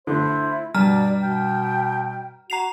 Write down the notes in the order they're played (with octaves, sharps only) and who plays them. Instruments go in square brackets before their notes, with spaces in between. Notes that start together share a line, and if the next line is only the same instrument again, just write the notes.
[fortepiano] D3 A3 [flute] E4 [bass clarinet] C5
[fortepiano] G2 [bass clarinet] B2 [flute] D5 [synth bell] A#5 F6
[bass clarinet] B2 [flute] G5
[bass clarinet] F#4 [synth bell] A#5 C7 F7